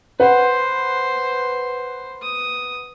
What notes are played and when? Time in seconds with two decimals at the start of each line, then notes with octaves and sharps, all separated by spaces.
0.20 B4 C5 F#5
2.22 D#6